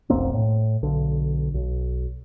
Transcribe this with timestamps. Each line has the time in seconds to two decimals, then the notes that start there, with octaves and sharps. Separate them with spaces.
0.10 F1 B1 A#3 C4
0.34 A2
0.83 B1 D3
1.54 B1